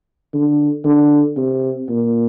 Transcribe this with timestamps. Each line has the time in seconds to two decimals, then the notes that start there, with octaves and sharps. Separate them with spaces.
0.33 D3
0.85 D3
1.37 C3
1.89 A#2